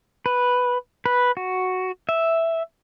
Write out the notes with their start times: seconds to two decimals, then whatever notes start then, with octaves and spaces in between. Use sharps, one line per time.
0.26 B4
1.06 B4
1.37 F#4
2.09 E5